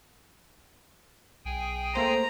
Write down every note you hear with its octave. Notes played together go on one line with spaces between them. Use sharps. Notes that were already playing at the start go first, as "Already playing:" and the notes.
B1 G#4 G5 G#5
A3 A#3 C5 A#5